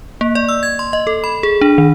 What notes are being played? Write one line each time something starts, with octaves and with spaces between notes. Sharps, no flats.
A#3
D5
E6
G#6
C6
D#5
A4
B5
G#4
D4
D#3